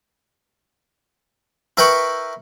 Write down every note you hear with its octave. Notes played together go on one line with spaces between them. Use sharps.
E4 A#4 B4 G5 B5 C#6